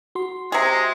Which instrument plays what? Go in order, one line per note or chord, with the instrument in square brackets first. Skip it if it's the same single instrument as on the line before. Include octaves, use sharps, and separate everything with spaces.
[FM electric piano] F#4 C6
[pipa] C3 G#4 [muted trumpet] G#3